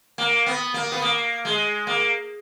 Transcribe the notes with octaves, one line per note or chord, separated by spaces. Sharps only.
A#3
B3
A#3
B3
A#3
G#3
A#3